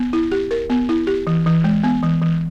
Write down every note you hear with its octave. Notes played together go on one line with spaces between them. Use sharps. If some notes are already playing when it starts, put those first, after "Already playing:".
Already playing: B3
E4
G4
A#4
B3
E4
G4
E3
E3
G#3
B3
E3
E3